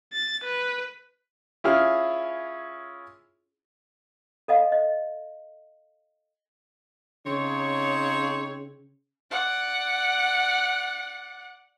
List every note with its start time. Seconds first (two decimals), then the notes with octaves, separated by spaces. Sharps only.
0.12 A6
0.44 B4
1.64 C#4 E4 F4 G#4 F6
4.48 A4 D#5 F5
4.72 D#5
7.26 C#3 C4 D#4 C#5
9.31 D5 F#5